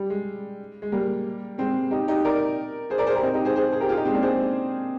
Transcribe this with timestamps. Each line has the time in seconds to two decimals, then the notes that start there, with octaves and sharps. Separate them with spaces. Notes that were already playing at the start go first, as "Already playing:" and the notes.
Already playing: G3
0.10 G#3
0.82 G#3
0.92 G3 A#3
1.58 G#3 C4
1.91 D#4 G4
2.08 D#4 G4
2.25 A#4 D5
2.90 G#4 C5
2.98 A#4 D5
3.07 G#4 C5
3.15 G4 A#4
3.23 C4 D#4
3.34 D#4 G4
3.45 G#4 C5
3.56 G#4 C5
3.72 G#4 C5
3.81 G4 A#4
3.89 F4 G#4
3.97 D#4 G4
4.05 G#3 C4
4.14 A#3 D4
4.22 G#4 C5